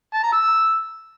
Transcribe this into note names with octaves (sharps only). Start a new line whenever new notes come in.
A5
A#5
E6